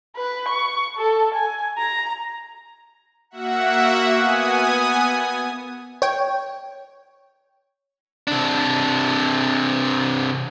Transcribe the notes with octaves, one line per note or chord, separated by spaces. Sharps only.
B4
C#6
A4
G#5
A#5
A#3 F#4 E5 F#5
B3 G#5 D#6
C#5 G5
C3 D4